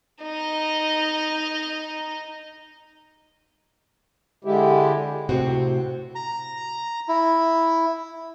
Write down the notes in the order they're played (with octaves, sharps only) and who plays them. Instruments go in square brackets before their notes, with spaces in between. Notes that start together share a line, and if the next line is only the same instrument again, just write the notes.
[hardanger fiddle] D#4 D#5
[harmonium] D3 G#3 E4 G4
[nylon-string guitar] A2 C3 C4 F#4
[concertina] A#5
E4